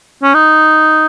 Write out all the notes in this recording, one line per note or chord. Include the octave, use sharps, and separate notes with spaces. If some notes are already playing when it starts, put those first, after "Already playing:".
C#4
D#4